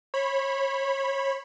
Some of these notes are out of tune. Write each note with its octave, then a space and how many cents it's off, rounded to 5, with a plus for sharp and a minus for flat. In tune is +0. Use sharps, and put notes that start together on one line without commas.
C#5 -30 B5 +0